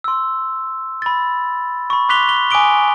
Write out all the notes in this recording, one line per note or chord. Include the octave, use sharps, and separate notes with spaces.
C6 E6
B5 A6
B5 C#6
C6 D6 F#6 B6 F7 G7
G7
G#5 D6 D#6 D7 G7